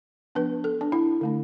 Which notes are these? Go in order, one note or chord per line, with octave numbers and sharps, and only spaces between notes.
F3 B3 D4 B4
A4
D4
E4
D3 A3 D4